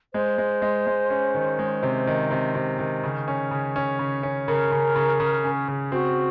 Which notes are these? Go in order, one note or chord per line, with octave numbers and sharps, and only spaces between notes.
G#3 C5
G#3
G#3
G#3
C#4
D#3
G#3
C3
D#3
C3
C3
D#3
C#3
C#4
C#3
C#4
C#3
C#4
C#3 A#4
C#3
C#3
C#3
C#4
C#3
C4 F#4